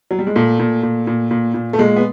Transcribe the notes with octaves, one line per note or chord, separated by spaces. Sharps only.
F#3
G3
G#3
A#2 A3
A#2
A#2
A#2
A#2
A#2
A3
A#2 G#3
B3